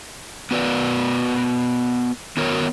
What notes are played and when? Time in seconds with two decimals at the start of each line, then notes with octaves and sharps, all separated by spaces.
0.51 B3 F#4 B4 D5
2.37 D#3 B3 F#4 A#4 C#5